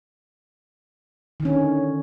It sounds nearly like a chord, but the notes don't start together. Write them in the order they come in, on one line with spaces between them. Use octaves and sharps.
D#3 D3 C#4